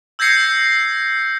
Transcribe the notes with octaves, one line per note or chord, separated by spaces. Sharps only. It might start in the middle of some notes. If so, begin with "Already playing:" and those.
E6 G6 G#6 A#6 C7 C#7